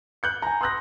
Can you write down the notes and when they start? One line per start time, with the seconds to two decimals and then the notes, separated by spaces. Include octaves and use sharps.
0.23 F#6 G6 C#7
0.42 G#5 A#5
0.61 C6 D#6 E6 F#6 G6 A#6